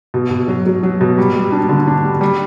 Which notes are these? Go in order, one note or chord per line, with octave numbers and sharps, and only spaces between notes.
B2
B2
F#3
F#3
F#3
B2
G3
G3
D4
D3
D4
G3
G3